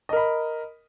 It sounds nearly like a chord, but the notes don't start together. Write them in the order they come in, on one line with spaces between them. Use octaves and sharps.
D#5 A#4 B5